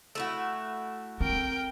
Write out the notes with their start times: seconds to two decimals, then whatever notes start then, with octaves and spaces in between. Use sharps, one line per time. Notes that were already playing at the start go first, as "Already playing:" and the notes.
0.15 A3 E4 F#4
1.20 C4 A#4 G5